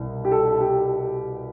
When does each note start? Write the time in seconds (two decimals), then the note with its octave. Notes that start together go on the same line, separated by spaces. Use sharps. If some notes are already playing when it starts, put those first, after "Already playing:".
Already playing: C2 B2
0.25 G4
0.31 A4
0.60 G4